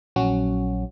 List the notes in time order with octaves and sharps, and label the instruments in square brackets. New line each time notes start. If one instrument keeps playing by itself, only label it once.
[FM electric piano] A#1 F#3 C#4 F#4